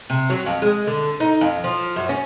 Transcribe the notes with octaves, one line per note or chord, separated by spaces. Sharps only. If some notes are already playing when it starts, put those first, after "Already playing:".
C3
F#3
F2
G#3
D3
D#4
F2
F3
F#2
C#4